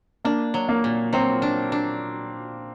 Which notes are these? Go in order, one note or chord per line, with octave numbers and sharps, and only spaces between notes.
A#3 D4
F#3
A#3
A#2
F#3 C4
D4
D4